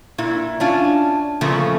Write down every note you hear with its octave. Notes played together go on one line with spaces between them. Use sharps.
A#2 E4
C#4 D4 F4
A#2 C#3 F3 A3 B3